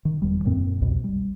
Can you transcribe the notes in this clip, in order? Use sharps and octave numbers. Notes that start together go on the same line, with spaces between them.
D#3
F1 E2 G3
F#2 A#2 A#3 C4
C2 F2 B2
G3